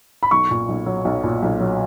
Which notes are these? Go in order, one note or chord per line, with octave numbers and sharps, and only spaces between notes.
B5
B1 C#6
A#2
B1
F#3
B1
A#2
B1
F#3